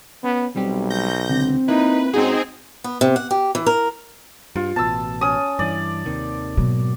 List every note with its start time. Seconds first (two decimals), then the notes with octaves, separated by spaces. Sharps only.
0.24 B3 C#4
0.56 B1 G3 C4 G4
0.90 G6 A#6
1.29 C#2 D3 C4
1.68 A#3 D#4 E4 B4
2.13 G#2 C4 C#4 D#4 F#4 G#4
2.84 B3
3.01 C3
3.16 F#5
3.31 G4
3.55 E3
3.66 A#4
4.56 G2 F4
4.76 A1 B2 A5 E6
5.21 C#4 D#6
5.59 G2 E3 D5
6.06 D#2 C3 D#3
6.57 G#2 B2 F#3 A#3